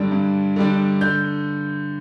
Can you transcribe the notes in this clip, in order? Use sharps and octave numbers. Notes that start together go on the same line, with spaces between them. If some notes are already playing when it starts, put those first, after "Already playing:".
Already playing: G2 D3 G3 D4
G2
D3 G3 D4
D3 G6